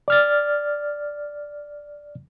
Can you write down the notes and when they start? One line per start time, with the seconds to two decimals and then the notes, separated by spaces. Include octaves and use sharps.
0.08 D5 F6 A6